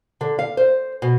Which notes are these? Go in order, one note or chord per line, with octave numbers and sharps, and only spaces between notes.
D3
F5
C5
B2